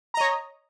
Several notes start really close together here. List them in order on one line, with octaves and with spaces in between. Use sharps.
A#5 D#5 C#5